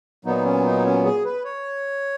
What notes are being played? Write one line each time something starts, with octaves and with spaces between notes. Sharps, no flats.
A#2 F#3 B3 D#4
C#4
D#4
C#4
G#4
B4
C#5